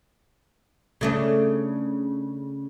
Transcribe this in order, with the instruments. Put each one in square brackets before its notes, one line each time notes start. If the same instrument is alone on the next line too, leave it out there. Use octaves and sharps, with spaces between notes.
[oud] C#3 A3 D4